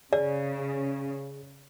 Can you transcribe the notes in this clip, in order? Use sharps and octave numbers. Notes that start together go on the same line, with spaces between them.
C#3 G#4 D5